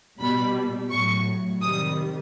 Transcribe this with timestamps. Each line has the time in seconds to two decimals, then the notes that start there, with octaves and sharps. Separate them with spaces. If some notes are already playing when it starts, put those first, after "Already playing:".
0.19 B2 G3 B5
0.91 A2 F#3 C#6
1.61 C3 D#3 G3 D#6